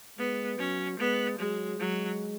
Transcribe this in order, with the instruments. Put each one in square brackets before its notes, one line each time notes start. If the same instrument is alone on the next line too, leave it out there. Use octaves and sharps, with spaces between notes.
[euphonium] G#3 [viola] B3
[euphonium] F#3 [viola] C#4
[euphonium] G#3 [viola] B3
[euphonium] F#3 [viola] G#3
[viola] F#3 [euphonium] G#3